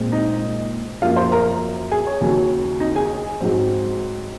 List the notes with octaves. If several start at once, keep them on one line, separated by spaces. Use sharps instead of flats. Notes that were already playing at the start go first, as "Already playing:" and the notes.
Already playing: A#2 G#3 C4
D#4 D#5
F#2 F3 A#3 F4 F5
C5 C6
A#4 A#5
G#4 G#5
C#5
D#2 C#3 F#3
D#4 D#5
G#4 G#5
G#2 F#3 C4